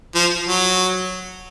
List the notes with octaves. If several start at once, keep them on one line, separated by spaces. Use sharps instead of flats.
F3
F#3